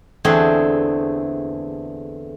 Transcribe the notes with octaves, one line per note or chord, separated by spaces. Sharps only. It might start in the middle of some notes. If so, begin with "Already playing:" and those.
E2 D3 A3 C4 G#4 F#5